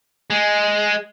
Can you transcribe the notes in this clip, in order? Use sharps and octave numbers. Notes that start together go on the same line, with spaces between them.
G#3